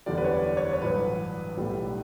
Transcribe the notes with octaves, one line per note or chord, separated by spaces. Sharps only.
F#1 E2 D3 G3 D5
B4
C#5
D5
C#5
C#5
A1 G2 F#3 B4
B1 A2 G3